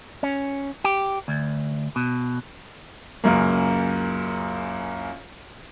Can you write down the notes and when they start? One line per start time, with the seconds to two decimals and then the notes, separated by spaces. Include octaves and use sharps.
0.23 C#4
0.84 G4
1.28 D2
1.96 B2
3.24 C#2 F#2 A#3